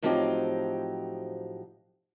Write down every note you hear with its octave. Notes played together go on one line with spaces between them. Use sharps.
A2 F3 F#3 C4 D#4 G4